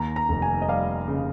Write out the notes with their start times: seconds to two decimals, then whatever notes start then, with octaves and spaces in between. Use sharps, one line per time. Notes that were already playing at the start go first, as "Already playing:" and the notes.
Already playing: D#2 A#5
0.16 A#5
0.29 F1
0.42 G#5
0.62 D#5
0.68 G3 F5
1.08 C#3